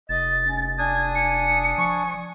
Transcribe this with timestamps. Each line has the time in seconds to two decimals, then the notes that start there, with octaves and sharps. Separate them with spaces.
0.09 F1 D#5 A6
0.44 C#4
0.78 D4 G#5 D#6 G#6
1.15 G#5 C#7
1.78 F3 C#6